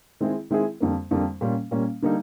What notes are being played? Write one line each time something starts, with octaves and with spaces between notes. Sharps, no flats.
D#3 G#3 C4 E4 G#4
D#3 G#3 C4 E4 G#4
F2 D3 G3 A#3
F2 D3 G3 A#3
A#2 G3 A#3 C#4
A#2 G3 A#3 C#4
D3 G3 A#3 D#4